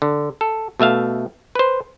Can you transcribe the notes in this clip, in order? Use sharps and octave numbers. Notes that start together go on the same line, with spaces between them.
D3
A4
B2 A3 E5 F5
B4 C5